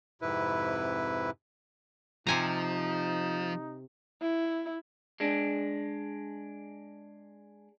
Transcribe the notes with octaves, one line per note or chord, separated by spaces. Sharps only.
F2 G#2 C3 E4 B4
C3 F3 D#4 G#5 A#5
E4
G#3 D4